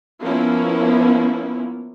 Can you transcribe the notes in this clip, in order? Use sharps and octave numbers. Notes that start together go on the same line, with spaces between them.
F3 A#3 B3 C#4 E4